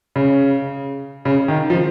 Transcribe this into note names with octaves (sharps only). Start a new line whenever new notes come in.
C#3
C#3
D#3
F3